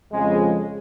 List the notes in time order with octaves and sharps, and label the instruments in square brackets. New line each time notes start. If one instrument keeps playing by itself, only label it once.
[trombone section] F2 C#3 F3 G#3